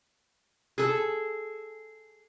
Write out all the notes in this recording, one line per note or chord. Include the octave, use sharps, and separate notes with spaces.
G#4 A4